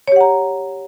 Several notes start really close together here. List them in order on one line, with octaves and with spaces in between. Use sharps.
C#5 G4 F#5 A#5